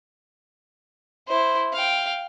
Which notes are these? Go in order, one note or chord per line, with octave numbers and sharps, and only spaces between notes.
E4 C5
F5 G5